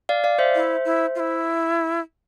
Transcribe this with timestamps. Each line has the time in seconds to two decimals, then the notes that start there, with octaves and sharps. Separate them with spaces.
0.09 D5 F5
0.24 D5 F5
0.39 C5 E5
0.55 E4
0.85 E4
1.15 F4
1.19 E4